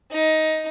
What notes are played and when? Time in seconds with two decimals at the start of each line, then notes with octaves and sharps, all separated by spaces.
0.11 D#4